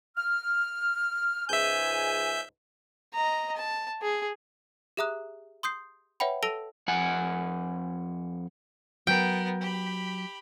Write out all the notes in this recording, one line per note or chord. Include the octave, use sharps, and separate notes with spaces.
F6
C#2 G#2 E5 G#5 G6
D#5 A#5
A5
G#4
G4 G#4 E5 A#5 D#6 F#6
C6 D#6 G6 C7
B4 C#5 E5 F#5 G5 B5
A4 A5 E6 A#6 D7 G7
F2 F#5 G#5
F#3 B3 A#4 G5
G4 B5